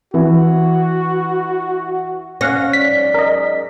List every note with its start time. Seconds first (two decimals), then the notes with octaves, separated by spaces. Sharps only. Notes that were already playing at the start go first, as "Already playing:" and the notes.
0.14 E3 F#4
2.41 C#4 F5 F#5 A#6
2.73 G#2 F#3 D5 B6
3.14 A#4 D#5